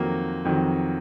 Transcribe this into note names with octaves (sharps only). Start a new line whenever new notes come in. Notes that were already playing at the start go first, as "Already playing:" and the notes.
Already playing: F2 D#3 F#3 A#3
F2 D#3 F#3